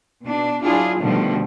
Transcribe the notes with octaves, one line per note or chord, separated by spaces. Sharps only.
B2 D4
F#3 D4 E4 F4 G#4
B2 D3 D#3 F3 G3 A3